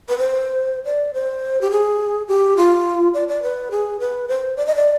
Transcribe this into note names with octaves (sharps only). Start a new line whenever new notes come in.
B4
C5
D5
C5
G4
G#4
G4
F4
D5
D5
B4
G#4
B4
C5
D5
D#5
D5